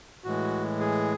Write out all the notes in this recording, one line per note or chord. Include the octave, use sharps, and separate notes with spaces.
A2 E3 G#3 F#4
G#4